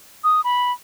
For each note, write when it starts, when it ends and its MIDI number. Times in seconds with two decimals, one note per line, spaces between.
0.24 0.41 87
0.44 0.72 83